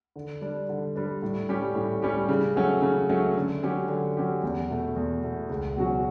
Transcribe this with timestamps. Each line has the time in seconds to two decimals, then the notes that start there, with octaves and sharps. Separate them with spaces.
0.16 D3
0.41 G3 D4
0.69 D3
0.95 G3 D4
1.23 A2
1.49 G3 C#4 G4
1.75 A2
2.02 G3 C#4 G4
2.29 C#3
2.56 F#3 A3 C#4
2.82 C#3
3.09 F#3 A3 C#4
3.36 D3
3.63 F#3 C#4 G4
3.89 D3
4.17 F#3 C#4 G4
4.43 E2
4.70 B2 A3
4.96 E2
5.23 B2 A3
5.50 C#2
5.76 B2 F#3 C#4 F#4